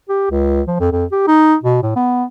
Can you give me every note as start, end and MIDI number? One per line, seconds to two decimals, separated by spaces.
0.09 0.27 67
0.31 0.62 37
0.68 0.78 53
0.80 0.89 41
0.92 1.05 41
1.12 1.23 67
1.27 1.55 63
1.64 1.78 47
1.83 1.93 45
1.96 2.24 59